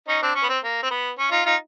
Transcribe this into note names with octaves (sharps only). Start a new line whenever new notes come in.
C#4 D#4
C4 D4
C#4
B3
C4
A#3
C4
B3
C#4
D#4 F4
D#4 F4